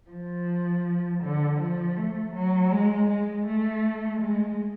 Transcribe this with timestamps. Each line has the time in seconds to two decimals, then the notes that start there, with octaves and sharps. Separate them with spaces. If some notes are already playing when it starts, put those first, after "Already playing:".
0.11 F3
1.22 D3
1.60 F3
1.97 A3
2.34 F#3
2.71 G#3
3.09 G#3
3.46 A3
4.20 G#3